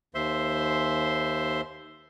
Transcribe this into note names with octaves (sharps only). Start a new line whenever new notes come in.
D#2 C5 E5 C6